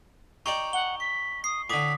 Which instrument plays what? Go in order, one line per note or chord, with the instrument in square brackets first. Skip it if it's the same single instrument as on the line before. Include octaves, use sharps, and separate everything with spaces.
[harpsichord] D#4 G4 D5 [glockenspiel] C#6
[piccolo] F#5 [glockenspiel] G7
[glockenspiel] C#6 [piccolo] B6
[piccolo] D#6 [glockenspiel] C7
[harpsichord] A2 D3 [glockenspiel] D6 D#6 [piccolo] B6